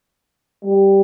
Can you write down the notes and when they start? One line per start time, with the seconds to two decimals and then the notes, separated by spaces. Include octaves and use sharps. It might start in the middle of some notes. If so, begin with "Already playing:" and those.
0.65 G3